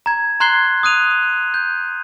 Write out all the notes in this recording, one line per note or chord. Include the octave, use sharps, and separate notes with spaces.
A#5 G#6
A#5 C6 F#6 G#6 C7 G7
D#6 F#6 D#7 F7
G6